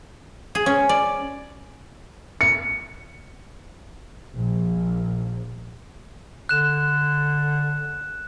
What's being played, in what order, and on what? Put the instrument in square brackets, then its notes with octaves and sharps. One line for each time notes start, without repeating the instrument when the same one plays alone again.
[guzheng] G#4
C#4
D5
[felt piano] C#7
[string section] A#1
[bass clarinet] D3 [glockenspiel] F#6 E7